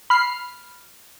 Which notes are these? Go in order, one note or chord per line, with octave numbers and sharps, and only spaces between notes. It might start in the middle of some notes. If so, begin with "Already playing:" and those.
B5 F6 C7